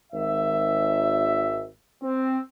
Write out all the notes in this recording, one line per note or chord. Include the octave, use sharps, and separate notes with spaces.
G#1 E5
C4